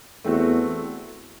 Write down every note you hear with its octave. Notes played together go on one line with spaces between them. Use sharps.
E2 A3 C4 F#4